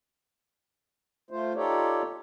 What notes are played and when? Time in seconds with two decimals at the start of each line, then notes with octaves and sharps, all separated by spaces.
1.31 A3 F4 C5
1.55 D#4 F4 G4 A4 C#5 D5